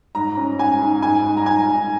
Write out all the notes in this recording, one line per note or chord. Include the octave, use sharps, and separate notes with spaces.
G#2 A#5
C#4
G#2 G#5
G#2
G#2 G#5
G#2
A#5
G#2 G#5
G#2